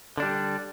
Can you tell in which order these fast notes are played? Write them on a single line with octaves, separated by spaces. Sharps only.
D3 D4 G3